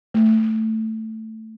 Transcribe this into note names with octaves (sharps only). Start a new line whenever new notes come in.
A3